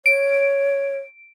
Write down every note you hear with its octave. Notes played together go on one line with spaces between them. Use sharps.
C#5 D7